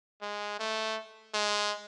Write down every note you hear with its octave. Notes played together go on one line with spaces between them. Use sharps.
G#3
A3
G#3